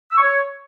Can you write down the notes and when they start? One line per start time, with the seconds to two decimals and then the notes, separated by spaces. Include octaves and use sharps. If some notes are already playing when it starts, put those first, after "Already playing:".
0.11 E6
0.16 C#6
0.22 C#5